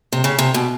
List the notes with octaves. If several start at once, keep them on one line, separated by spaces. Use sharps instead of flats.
C3
C#3
C3
B2